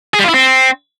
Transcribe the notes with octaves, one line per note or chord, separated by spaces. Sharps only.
G#4
G3
F4
E4
C4